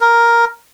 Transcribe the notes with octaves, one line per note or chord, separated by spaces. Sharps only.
A#4